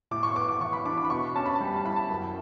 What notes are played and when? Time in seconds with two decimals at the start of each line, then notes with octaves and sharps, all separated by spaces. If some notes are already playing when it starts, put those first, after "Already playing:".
0.11 A2 D6
0.23 C#6
0.36 B3 D6
0.48 D6
0.60 E3 C#6
0.73 B5
0.85 D4 D6
0.97 D6
1.05 B5
1.10 B2 C#6
1.36 C#4 A5
1.46 B5
1.55 A5
1.60 G3 B5
1.76 A5
1.85 E4 B5
1.96 A5
2.10 F#2